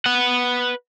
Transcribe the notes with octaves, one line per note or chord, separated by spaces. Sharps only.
B4 F#5